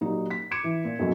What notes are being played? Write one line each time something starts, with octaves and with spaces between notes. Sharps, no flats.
A#2 F#3 D#4 G4
B6
D6 G#6 C#7 D7 E7
E3
A#2
B1 F#2 F#3